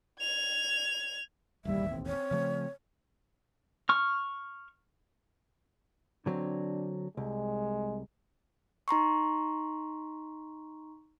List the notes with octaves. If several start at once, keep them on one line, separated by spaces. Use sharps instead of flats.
G#6 F7
E1 A1 D#2 G3 E5
C4
C#5
C#3 F3 A3
C#6 F6
D3 F#3 C4 D4
C2 G#3
D#4 A#5 C6 C#6